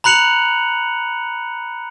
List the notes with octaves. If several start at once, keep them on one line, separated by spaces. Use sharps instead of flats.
A#5 B5 F#6 C#7 F7 F#7